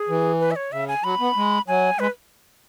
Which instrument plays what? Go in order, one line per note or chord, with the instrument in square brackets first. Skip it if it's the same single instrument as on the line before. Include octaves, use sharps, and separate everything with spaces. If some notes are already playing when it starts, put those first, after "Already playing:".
Already playing: [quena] G#4
[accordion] E3
[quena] B4
E5
C#5
[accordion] C#3 [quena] E5
[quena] G#5
[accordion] F#3 [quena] B5
[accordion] B3
G#3
[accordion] F#3 [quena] G#5
[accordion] G#3 [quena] B4